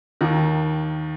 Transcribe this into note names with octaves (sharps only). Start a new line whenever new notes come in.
D#2 D#3